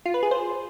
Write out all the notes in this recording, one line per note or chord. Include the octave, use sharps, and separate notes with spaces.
F4
B4
G#4
C5